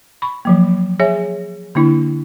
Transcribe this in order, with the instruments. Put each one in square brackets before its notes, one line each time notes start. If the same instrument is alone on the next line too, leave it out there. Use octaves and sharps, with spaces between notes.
[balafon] B5 C#6
F3 F#3 A#3
G#4 C#5 E5 G#5
D3 A#3 D4 E4